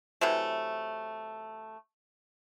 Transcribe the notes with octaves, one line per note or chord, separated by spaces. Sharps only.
C3 E3 F#3 A3